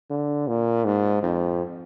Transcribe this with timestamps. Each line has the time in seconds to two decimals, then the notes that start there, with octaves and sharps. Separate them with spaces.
0.11 D3
0.48 A#2
0.85 G#2
1.23 F2